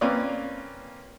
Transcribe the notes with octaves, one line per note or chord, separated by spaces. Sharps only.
A#3 C4 C#4 F4 B4 D5